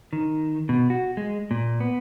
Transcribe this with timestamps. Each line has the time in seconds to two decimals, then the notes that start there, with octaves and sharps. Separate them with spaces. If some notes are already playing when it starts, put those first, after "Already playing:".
0.13 D#3
0.69 B2
0.90 F#4
1.17 G#3
1.51 A#2
1.80 B3